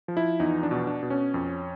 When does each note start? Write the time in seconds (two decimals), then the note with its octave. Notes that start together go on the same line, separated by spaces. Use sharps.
0.08 F3
0.17 E4
0.40 E2 D#4
0.63 D4
0.71 B2
0.87 D4
1.03 B2
1.10 C#4
1.34 F2